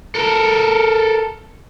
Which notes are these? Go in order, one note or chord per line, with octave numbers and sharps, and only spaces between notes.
A4 A#4